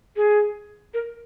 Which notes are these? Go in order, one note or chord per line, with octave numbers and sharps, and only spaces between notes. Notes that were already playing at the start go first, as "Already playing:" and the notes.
G#4
A#4